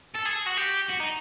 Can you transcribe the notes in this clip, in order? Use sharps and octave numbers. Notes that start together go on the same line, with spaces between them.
A4
G#4
F#4
G4
F#4
D#4